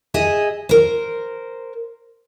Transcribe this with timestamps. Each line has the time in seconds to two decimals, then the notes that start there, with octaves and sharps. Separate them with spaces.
0.14 G#4 D#5 E5
0.69 A#4 C5